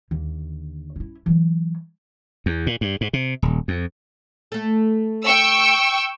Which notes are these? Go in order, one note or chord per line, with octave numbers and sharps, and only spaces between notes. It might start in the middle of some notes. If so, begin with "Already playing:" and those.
D#2 D3
C#4 E4
E3 F#3
E2
A#2
G2
G#2
C3
D#1
F2
A3 A4
G5 C#6 E6